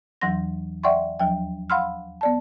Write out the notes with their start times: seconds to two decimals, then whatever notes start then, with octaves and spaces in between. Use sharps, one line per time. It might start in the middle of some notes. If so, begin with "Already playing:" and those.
0.21 E2 E3 F#3 F#5 C6 A#6
0.84 D5 E5 F#5 G5 C6 C#6
1.20 D#2 F3 F#3 G5
1.70 F5 F#5 B5 C6 E6 F6
2.21 B3 D5 A5